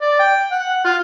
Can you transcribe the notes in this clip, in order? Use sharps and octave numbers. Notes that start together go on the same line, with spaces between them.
D5
G5
F#5
F4